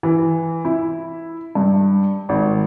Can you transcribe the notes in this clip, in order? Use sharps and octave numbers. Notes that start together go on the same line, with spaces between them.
E3
E4
G2
G#1